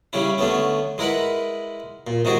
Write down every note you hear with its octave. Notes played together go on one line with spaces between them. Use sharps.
C#3 G3 C#4 E4
D3 A3 B3 C#4
G#3 E4 A#4 B4 F#5
A#2
G#2 C3 D#3 F#4 G#4